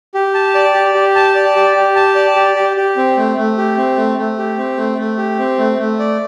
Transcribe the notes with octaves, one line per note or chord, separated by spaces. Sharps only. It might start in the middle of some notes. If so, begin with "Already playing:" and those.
G4
A5
D5
G4
G4
A5
D5
G4
G4
A5
D5
G4
G4
G4
C4
A3
A3
G4
C4
A3
A3
G4
C4
A3
A3
G4
C4
A3
A3
D5